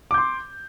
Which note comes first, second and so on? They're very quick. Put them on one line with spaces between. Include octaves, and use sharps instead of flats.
D6 G6 C6